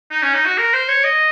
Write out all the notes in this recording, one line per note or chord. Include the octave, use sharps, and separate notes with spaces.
D#4
C#4
D#4
F#4
A#4
C5
C#5
D#5